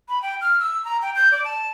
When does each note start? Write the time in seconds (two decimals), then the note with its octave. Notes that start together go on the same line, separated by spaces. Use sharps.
0.09 B5
0.22 G5
0.41 F6
0.60 E6
0.85 A#5
1.02 G5
1.15 G6
1.32 D5
1.44 A5